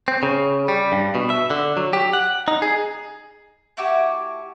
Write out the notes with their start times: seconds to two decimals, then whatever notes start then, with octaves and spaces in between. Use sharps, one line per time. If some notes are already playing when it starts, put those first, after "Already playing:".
0.08 C4
0.23 C#3
0.68 G3
0.92 G2
1.15 B2
1.30 E5
1.50 D3
1.77 F#3
1.93 G4
2.13 F#5
2.48 D#4
2.62 G#4
3.77 A3 E4 F#4 G4